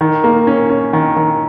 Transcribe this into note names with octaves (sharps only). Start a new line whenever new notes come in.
D#3
A#3
C#4
C#4
D#3
D#3